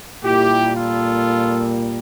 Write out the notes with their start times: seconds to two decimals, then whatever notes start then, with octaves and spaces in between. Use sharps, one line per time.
0.23 A#2 G3 A#3 E4 G4
0.76 F4 A4